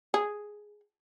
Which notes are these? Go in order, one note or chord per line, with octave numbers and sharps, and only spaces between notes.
G#4